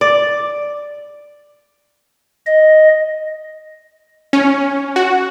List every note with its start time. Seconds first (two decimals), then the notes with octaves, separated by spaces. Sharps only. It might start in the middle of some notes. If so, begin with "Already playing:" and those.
0.01 D5
2.46 D#5
4.33 C#4
4.96 F#4